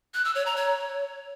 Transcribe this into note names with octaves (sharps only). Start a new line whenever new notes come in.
F#6
E6
C#5
A#5
C#5